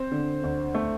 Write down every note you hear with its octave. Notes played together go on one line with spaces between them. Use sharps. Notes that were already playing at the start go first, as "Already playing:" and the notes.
Already playing: C4 C5
D3
D2
A3